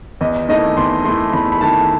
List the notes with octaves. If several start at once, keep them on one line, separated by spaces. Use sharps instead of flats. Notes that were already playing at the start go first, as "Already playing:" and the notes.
E2 D#5
D#3 A3 E4 D#5
E2 C6
D#3 A3 E4 C6
E2 B5
B5
D#3 A3 E4 A5